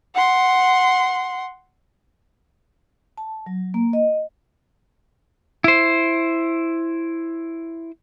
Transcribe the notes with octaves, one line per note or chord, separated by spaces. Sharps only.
F#5 C6
A5
F#3
A#3
D#5
E4 C5